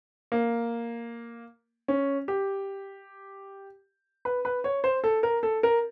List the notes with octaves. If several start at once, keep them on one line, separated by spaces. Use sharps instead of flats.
A#3
C#4
G4
B4
B4
C#5
C5
A4
A#4
A4
A#4